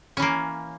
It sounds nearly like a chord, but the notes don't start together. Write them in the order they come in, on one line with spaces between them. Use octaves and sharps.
C#4 E3 A#3